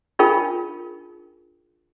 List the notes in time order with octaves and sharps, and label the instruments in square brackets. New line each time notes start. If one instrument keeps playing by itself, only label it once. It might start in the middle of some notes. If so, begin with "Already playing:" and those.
[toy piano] D4 D#4 F4 G#4 A#4 G5